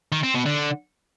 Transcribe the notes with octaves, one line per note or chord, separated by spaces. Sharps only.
D#3
C4
B2
D3